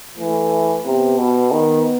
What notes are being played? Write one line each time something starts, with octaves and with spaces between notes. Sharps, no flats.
E3 A3
C3 B3
B2
D#3 B3